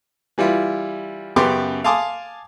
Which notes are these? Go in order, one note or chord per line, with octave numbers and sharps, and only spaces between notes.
E3 G3 E4 F4
F#2 C#3 B3 G4 C6 D6
F5 G#5 A5 C6 D6 D#6